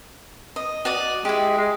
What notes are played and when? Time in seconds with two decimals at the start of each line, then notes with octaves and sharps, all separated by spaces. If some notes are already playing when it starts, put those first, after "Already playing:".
0.56 D#5
0.85 F#4 D5 D#5
1.25 G#3 E4 G4
1.58 G#3